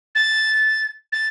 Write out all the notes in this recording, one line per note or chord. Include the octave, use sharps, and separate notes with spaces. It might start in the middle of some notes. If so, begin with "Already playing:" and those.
A6
A6